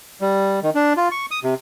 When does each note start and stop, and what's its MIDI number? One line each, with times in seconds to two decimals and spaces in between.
0.21 0.60 55
0.63 0.70 51
0.75 0.93 62
0.97 1.09 65
1.11 1.26 85
1.31 1.40 87
1.44 1.54 48